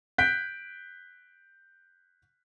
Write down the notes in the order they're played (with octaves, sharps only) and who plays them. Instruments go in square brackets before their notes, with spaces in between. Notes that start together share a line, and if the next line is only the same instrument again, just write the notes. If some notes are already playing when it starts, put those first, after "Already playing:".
[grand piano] F#6 G6 B6 D7